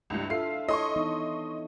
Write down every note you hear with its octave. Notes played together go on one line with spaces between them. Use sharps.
C#2 G2 D4 E4
F4 A4 E5 C7
E4 A4 C#5 D#5 C6 C#6
E3 B3 D#4